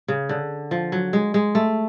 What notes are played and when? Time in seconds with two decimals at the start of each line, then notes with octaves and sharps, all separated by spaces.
0.08 C#3
0.29 D3
0.71 F3
0.92 F#3
1.13 G#3
1.34 G#3
1.55 A3